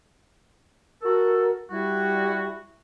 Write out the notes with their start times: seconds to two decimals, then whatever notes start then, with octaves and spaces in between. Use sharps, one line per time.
1.02 F#4 A4 A#4
1.70 G3 E4 F#4